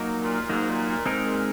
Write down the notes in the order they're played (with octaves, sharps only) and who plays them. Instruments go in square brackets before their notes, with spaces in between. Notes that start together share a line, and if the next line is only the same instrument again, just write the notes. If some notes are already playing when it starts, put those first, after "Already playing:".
Already playing: [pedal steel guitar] F#3 A#3 D#4
[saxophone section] A#2
[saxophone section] G#2 [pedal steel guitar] F#3 A#3 D#4
[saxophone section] A#2
A#2
[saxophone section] G#2 [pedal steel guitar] G#3 C4 D#4 A#4
[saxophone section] A#2